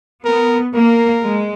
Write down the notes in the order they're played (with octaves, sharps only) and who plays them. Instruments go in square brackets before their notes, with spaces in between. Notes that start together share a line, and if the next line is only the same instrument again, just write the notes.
[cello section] B3 [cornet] A#4
[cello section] A#3 [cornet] A#4
[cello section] G#3